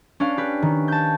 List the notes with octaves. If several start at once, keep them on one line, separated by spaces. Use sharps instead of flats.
C#4 D4 B4 F5
G4 B4
D#3
A5 G6